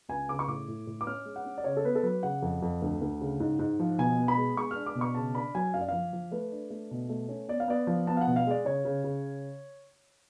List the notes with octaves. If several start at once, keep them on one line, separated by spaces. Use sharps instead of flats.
C#2 G#5
C#3 D6
C#6
A2 D6
A2
A2
D6
C#4 F6
G#3
F#5
C#4
D5
C#3 C#5
A4
B3 B4
A4
F#3 B4
C#3 F#5
F2
F2
D2
D2
C#3
G#2
G#2
F3
B2 G#5
B3
B5
G#3
G#3 C#6
D4 F6
D6
B2
C#6
C#3 A5
D4 B5
F#3 G#5
F#2 F5
D5
F3 F5
F3
A3 B4
D4
A3
B2
A3
C#4
B3 D5
F5
B3 D5
F3
B3 A5
F5
F#5
B2
F5
G#3 D5
C#3 C#5
C#3
C#3